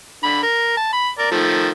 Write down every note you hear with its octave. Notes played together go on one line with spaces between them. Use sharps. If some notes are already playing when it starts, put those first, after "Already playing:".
D3 B5
A#4
A5
B5
A#4 D5
D#3 F3 A3